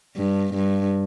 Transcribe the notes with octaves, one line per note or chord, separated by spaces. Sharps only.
G2
G2